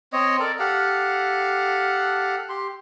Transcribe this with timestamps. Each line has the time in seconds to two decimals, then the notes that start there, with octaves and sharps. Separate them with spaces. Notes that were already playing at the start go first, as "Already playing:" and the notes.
0.13 C4 C#5 D#5
0.40 A4 A#4 D5
0.59 G4 A4 F5 F#5
2.49 G4 C6